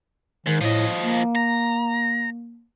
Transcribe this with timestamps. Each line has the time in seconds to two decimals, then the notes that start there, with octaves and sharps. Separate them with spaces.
0.46 G#2 D#3
0.61 A2 F3 D#5
1.00 A#3
1.35 A#5